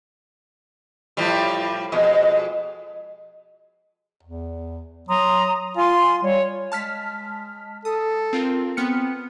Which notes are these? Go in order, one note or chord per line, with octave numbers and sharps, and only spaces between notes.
A2 F3 G3
F2 B2 G#3
E2
F#3 A#5 C6 D#6
F4 G#5 C6
G3 C#5
G#3 A5 F6 B6
A4 D#6
C4 F4 A#4
B3 C4 F6 C#7